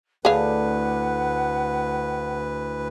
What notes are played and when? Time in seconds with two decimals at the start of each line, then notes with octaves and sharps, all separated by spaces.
0.25 D2 A2 D4 G#4 B4 F5 F#5